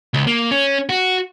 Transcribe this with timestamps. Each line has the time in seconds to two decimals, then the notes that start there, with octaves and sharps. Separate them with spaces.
0.14 C#2
0.27 A#3
0.51 C#4
0.89 F#4